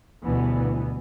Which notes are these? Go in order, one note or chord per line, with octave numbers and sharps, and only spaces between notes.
D2 G2 B2 E3 B3